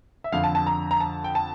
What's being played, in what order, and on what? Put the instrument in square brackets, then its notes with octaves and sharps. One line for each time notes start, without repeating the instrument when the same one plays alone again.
[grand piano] E5
F2 D3 F5
A5
A5
A#5
A#5
A5
G5
A5